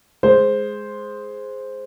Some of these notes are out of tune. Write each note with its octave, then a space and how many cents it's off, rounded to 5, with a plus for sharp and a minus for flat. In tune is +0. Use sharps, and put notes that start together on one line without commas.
G#3 +0 C5 +0